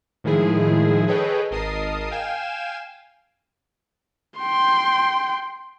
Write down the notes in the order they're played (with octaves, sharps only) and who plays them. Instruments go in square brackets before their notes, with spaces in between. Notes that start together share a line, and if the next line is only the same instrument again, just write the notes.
[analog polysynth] A2 D#3 F3 G#3 E4 G#4
G#4 A4 B4 C#5 D#5 G5
G#1 A#4 D#5 A5 D#6 C7
F5 G5 G#5 E7
[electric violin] G5 C6